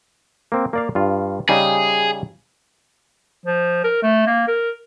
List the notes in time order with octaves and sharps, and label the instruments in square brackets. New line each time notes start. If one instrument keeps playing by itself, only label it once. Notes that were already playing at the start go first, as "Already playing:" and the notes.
[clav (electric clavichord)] A#3 C4
A#3 D5 F5
G2 F4
[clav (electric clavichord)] C#3 G3 D#4 [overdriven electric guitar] G#4
[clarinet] F3
A#4
A3
A#3
A#4